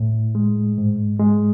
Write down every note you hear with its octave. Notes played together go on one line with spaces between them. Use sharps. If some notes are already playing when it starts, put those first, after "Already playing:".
Already playing: A2
G#3
G#2
G#3